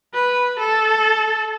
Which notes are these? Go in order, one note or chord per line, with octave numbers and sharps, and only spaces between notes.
B4
A4